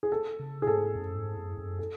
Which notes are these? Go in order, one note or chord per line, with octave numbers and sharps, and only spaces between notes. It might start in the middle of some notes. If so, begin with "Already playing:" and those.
G#4
A4
C#3
G#4
G#2 A4
F#2
G#2
F#2
F#2
A4